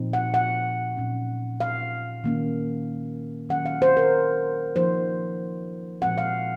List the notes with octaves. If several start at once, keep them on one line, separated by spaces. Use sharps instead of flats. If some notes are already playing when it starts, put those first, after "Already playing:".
Already playing: A#2 F3 C4 D#4
F#5
F#5
A#2 F#3 C#4
F5
D#3 A#3 C#4
D#3 F#3 C#4 F#5
F5
C5
A#4
F3 A#3 D#4 C5
A#2 F3 G#3 C4 F#5
F5